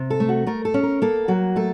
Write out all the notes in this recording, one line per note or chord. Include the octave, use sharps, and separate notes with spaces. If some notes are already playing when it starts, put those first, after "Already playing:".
Already playing: C3
A4
A3
F#4
A3 A#4
A4
C#4
A#4
A#3 A4
F#3 F#4
A3 A4